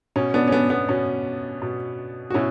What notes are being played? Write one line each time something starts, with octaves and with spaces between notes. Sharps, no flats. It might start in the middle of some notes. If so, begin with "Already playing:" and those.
B2 C#4
B3 D4
C#4
B3 D4
B3
B2 C#4
B2
F#4
B2 C#4 E4